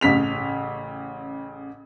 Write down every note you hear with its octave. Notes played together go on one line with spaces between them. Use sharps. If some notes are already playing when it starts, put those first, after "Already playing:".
A1 C#3 B6 F7